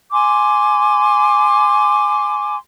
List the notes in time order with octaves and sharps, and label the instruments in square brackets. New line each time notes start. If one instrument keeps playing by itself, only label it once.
[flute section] G#5 C6 D6